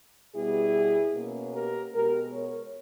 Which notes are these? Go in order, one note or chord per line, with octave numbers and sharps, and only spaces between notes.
B2 G3 B3 E4 G#4
B2 A#3 C#4
G4 A#4
B2 G#3 B3 G4 A#4
A#4 C#5